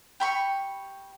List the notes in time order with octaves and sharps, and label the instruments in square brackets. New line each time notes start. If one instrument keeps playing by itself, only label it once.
[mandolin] G4 B5 C#6